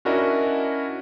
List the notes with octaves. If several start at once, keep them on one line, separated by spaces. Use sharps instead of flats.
C#4 D4 E4 F#4 A#4 D#5